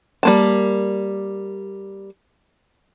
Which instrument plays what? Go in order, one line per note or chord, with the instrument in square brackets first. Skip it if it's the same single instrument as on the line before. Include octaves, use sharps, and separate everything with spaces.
[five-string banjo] G3 A#3 A5